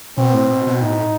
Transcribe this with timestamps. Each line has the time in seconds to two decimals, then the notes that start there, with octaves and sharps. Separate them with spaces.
0.17 B2 C4
0.34 A2
0.50 B2
0.67 B2
0.83 A2 D#4